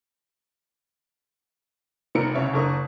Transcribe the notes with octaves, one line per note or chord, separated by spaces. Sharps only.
F1 D#3 A#3 A#5 C#7 D7
C2 C#3 C#5 E5
F#1 D4 A#4 C#6 D#6